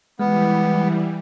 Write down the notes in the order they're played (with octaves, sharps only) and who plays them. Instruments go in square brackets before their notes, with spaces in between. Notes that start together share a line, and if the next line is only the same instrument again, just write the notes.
[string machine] E3 G3 [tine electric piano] G#3 [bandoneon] B3